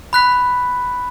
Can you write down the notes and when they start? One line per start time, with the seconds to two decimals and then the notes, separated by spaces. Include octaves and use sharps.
0.13 B5 F#6 B6